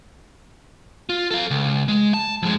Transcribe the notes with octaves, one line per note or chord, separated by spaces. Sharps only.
F4
A4 F5
C#2
G#3
A5
F2 G#3